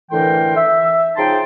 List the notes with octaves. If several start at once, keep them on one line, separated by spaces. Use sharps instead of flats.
A2 D3 E3 A#4 G5 C6
E5
C#3 F3 D#4 G5 A5 C6